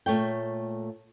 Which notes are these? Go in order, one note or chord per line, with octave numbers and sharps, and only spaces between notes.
A#2 A3 C#5 G5